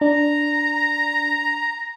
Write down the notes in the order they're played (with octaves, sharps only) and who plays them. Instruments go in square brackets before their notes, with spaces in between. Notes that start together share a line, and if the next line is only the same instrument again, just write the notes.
[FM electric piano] D4 [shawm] A#5